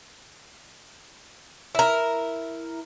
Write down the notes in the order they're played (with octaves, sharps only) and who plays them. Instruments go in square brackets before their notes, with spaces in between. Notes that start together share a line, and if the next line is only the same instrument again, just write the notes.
[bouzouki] E4 A#4